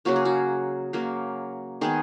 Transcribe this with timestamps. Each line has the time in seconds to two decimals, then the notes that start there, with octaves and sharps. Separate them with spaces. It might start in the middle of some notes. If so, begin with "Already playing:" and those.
0.05 C#3 F#3 A#3 F#4
0.16 G#4
0.25 F#4
0.93 C#3 F#3 A#3
1.81 D#3 G#3 B3 G#4